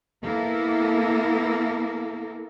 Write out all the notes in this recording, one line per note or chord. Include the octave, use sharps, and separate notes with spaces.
A#3 B3 E4 A4 A#4